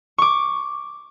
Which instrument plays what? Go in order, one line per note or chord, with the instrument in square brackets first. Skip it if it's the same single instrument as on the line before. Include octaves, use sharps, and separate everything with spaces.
[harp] C#6 D6